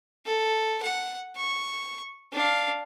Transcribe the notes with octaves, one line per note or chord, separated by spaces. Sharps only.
A4
F#5
C#6
D4 F5